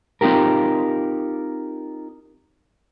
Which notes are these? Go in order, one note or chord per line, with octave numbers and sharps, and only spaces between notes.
C4 D#4 F4 G4 A#4